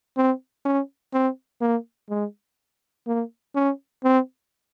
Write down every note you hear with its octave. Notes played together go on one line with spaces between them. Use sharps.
C4
C#4
C4
A#3
G#3
A#3
C#4
C4